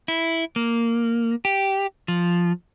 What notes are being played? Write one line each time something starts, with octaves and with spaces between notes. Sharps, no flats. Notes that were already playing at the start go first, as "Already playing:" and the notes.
E4
A#3
G4
F3